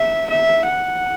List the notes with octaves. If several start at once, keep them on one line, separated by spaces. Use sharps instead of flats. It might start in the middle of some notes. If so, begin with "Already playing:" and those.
Already playing: E5
E5
F#5